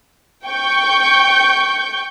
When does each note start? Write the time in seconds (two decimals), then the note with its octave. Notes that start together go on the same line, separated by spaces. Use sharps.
0.47 G5 C#6 G6